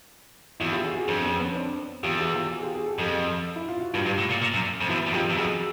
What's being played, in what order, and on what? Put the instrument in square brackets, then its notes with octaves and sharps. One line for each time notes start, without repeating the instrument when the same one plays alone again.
[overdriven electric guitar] E2 [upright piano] E4 F#4
[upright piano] F4 G4
F#4 G#4
F#4 G#4
[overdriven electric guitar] F2 [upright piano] C4 D4
[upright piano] B3 C#4
B3 C#4
C4 D4
[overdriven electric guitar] E2 [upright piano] F4 G4
[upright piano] F#4 G#4
F4 G4
F#4 G#4
F4 G4
F#4 G#4
G4 A4
[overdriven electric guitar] F2
[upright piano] E4
F4
F#4
[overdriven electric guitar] G2 [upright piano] F4 G4
[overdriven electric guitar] G2
A2
A#2
A#2
F#2
F2
[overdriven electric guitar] E2 [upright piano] E4 F#4
[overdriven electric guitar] E2
[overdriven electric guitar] F2 [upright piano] F4 G4
[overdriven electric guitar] E2
[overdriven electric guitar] F2 [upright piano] F#4 G#4